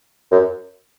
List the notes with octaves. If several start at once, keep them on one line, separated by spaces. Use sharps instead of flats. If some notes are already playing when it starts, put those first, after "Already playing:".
F#2